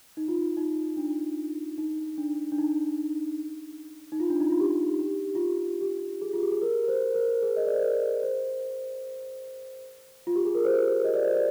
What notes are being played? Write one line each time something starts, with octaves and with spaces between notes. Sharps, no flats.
D#4
F4
D#4
D#4
D4
D#4
D4
D4
D#4
D#4
F4
D4
D#4
F4
G4
G4
F4
G4
G4
G#4
F4
G4
G#4
A#4
C5
A#4
G#4
D#5
D5
C5
A#4
C5
F4
G4
G#4
A#4
C5
D#5
D5
C5
D5